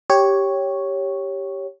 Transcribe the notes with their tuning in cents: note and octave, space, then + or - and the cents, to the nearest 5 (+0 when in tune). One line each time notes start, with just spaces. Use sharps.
G4 +0 C#5 +0